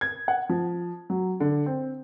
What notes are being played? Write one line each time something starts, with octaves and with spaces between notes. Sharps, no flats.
G#6
F#5
F3
F#3
D3
C4